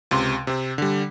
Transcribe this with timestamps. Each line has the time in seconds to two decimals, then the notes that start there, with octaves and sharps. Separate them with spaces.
0.11 C#2 C3 C6
0.47 C3 C4
0.78 D3 G3